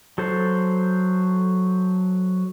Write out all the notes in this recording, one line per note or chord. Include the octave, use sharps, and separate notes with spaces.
F#3 A4 C5